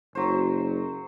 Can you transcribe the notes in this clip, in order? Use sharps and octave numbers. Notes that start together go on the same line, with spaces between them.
F#1 F#3 C5